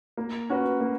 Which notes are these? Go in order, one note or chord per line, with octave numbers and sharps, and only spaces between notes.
A#3
C#4 F#4 B4
A#3